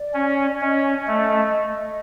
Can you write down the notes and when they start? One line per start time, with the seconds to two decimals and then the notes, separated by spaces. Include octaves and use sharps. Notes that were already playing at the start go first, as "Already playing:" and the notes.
Already playing: D5
0.14 C#4
0.61 C#4 D#5
1.07 A3